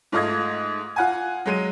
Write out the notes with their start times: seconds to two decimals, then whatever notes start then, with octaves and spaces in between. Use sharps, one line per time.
0.12 G#2 A3 F4 D#5 G#6
0.96 F4 F#5 G#5
1.46 F#3 G#3 D#7